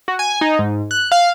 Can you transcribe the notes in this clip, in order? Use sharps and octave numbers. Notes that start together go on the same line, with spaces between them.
F#4
G#5
D#4
G#2
F#6
F5